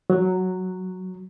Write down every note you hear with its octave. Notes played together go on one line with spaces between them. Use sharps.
F#3